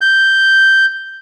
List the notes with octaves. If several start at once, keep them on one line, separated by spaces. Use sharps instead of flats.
G6